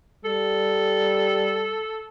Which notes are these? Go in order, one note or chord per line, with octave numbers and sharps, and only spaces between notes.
G3 A4